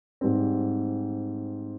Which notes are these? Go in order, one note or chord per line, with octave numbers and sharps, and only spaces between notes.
G#2 G3 C4